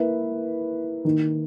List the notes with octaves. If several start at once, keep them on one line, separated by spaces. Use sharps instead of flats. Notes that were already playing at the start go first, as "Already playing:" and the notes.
Already playing: A#3 E4 B4 E5
D#3 A#3 D#4